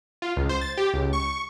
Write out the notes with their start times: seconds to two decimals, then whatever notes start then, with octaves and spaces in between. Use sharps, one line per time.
0.22 F4
0.37 C#2
0.49 C5
0.61 A6
0.77 G4
0.93 C#2
1.13 C#6